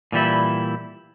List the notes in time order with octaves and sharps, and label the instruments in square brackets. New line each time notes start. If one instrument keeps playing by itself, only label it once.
[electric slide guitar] A#2 E3 G3 E4